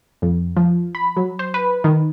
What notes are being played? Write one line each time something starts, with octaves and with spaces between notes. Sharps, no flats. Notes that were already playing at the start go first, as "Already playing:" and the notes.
F2
F3
B5
F#3
C5
B4
D#3